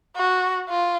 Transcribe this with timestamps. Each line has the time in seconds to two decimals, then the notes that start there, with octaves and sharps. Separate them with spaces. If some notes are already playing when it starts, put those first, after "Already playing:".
0.17 F#4
0.69 F4